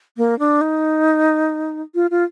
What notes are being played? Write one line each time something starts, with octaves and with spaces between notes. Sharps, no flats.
A#3
D4
D#4
F4
F4